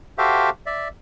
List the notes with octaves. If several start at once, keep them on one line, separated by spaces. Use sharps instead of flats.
F#4 G4 A4 C5 E5 F5
D5 E5